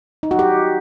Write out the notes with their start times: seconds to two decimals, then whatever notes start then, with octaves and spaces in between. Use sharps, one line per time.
0.23 D#4
0.31 F#4
0.39 G4